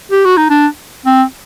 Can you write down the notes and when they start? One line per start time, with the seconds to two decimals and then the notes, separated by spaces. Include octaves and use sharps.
0.11 G4
0.24 F#4
0.37 D#4
0.50 D4
1.06 C4